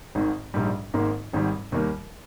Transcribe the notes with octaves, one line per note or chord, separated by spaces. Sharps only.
G#1 G#2 D#3
A#1 G#2 G3
G#1 G#2 D#3 A#3
G#1 G#2 D#3 G3
D#2 D#3 G3 A#3